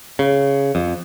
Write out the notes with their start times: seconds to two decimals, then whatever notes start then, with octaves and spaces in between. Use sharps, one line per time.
0.19 C#3
0.75 F2